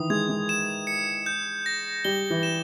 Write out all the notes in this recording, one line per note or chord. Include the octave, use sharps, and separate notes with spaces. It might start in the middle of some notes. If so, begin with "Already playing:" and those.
Already playing: D#3 E3 D#6
G#3 G#6
G#3
E7
C#7
G6
A#6
G3 G7
E3
E7